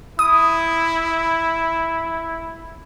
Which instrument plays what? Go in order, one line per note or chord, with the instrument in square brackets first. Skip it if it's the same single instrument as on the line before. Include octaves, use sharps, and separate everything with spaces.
[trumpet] E4 [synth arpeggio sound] D#6